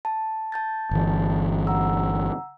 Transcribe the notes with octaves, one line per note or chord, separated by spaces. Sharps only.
A5
A5 G6 A6
G1 E3
F#5 A#5 E6